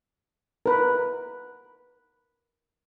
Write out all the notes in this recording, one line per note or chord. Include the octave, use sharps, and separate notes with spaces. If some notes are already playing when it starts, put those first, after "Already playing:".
A#4 B4